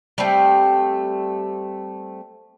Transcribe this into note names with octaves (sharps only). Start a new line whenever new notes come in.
G3 A3 C4